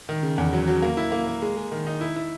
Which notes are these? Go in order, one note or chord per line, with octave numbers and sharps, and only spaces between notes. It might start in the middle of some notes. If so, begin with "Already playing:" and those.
D#3
C#3
E2
F#3
F#3
A#3
E4
A#3
A#3
G#3
G#3
D#3
D#4
E4
E4